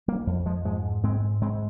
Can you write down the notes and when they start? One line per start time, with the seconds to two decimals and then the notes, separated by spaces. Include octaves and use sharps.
0.08 G3 A#3
0.27 F2
0.46 F3 G#3
0.65 G#2 F3 G#3
1.03 G#2 G#3 C4
1.41 G#2 G#3 C4